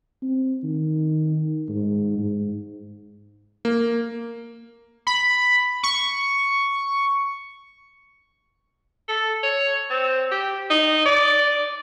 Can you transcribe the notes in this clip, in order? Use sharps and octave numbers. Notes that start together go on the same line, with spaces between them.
C4
D#3
G#2
G#2
A#3
B5
C#6
A4
C#5
C4
G4
D#4
D5